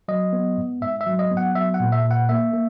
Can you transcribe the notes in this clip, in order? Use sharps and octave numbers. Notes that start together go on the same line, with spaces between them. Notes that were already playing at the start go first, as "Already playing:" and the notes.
F#3 D#5
B3
G#2
G#2 E5
E5
F#3
D#5
B3
F#5
F#3 E5
F#5
A#2
E5
A#2
F#5
A#3 E5
A#3